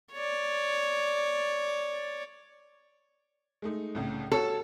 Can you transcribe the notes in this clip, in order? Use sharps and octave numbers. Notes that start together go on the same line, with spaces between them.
C#5 D5
G#3 A3 D#4
C2 A2 C#3
F#4 A4 C#5 A5